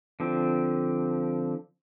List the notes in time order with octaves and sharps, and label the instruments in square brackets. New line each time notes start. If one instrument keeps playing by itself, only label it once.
[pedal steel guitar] D3 F3 C4